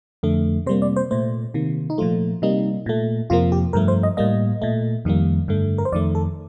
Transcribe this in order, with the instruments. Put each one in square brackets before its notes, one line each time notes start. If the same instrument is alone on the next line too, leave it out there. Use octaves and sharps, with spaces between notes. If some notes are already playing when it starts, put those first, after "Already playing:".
[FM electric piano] F2 D3 A3
C3 G3 A#3 C5
D5
C5
A#2 A3 C5
C3 D#3 A#3
D#4
A#2 F3 A3 F4
C3 G3 A#3 D#4
A#2 A3
F2 C3 F3 A#3 F4
G4
G2 F3 A3 A#4
C5
D#5
A2 G3 A#3 D#5
A#2 A3
F2 D#3 G3 A#3
G2 D3 A3
A#4
C5
F2 D#3 A3 D5
A4